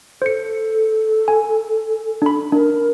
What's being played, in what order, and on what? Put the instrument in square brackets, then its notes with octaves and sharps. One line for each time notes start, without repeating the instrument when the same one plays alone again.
[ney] A4 [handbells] C5 C#7
[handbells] G#5
D4 B5
[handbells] D4 [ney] A#4